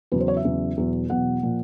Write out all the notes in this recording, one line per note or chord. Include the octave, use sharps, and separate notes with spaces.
E2 C#3 F#3 B4
C5
C#5
E5
E2 C#3 F#3
E2 B2 F#3
E2 B2 F#3 F#5
A#2 F3